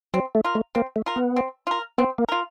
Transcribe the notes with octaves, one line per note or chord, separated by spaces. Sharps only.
F#3 C4
A3
F4 A#4
A3
A#3 C4
A3
F4 A#4
B3
C4
F4 A#4
B3 C4
A#3
F4 A#4